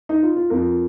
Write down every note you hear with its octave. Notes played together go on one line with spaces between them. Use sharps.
D#4
F4
F4
F2 F3 A#4